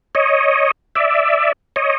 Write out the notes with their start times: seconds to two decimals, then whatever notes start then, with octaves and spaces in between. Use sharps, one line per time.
0.15 C#5 D#5
0.95 D5 E5
1.76 C#5 D#5